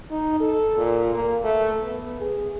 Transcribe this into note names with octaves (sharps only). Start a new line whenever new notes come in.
D#4
A4
A#2
A#3
A3
B3
G#4